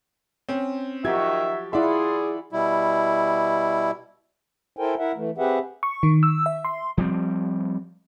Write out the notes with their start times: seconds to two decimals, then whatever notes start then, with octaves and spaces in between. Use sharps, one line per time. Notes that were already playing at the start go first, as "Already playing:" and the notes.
0.49 C4 C#4
1.05 D#3 F3 F#4 G4 E5 G#6
1.73 E4 F4 G#4 D5 E5 F#5 C6
2.53 B2 G3 E4
4.77 E4 A4 A#4 C5 G5 G#5
4.99 E4 A#4 E5 F#5
5.16 E3 A3
5.38 C4 G4 G#4 B4 E5 F#5
5.83 C#6
6.03 D#3
6.23 E6
6.46 E5
6.65 C6
6.97 F3 G3 C4